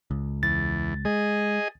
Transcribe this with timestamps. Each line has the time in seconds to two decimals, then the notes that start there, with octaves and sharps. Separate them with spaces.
0.11 C#2
0.43 E2 A6
1.05 G#3 G#4 D#5